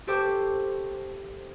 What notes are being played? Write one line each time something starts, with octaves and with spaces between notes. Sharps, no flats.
G4 A4 C5 G5 C#6 D6